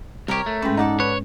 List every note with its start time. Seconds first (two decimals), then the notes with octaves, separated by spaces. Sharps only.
0.28 C2 G4 A#4 C#5
0.46 A3
0.62 G#2 G#3 C#4 B4 G5
0.77 D#4 A4 D5 F#5
1.00 B4 C#5